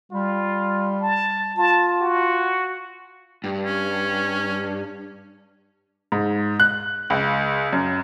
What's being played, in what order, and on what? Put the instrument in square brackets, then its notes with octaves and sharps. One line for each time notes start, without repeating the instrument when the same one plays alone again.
[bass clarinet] G3 [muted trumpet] F4
[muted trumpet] A5
[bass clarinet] F4 [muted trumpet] A5
[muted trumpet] F#4
[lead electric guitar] G2
[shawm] C#4
[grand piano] G#2
F#6
C#2
F#2